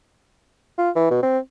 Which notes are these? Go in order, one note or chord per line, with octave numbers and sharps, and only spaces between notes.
F4
E3
B2
C4